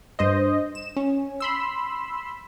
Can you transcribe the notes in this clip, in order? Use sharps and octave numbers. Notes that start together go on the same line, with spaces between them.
G2 C5 D#5
E7
C#4
B5 C6 E6